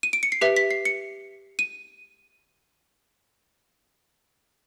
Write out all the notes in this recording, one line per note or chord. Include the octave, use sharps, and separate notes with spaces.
D#7
D7
C#7
C7
G4 B4 E5 B6
B6
C7
C#7
D#7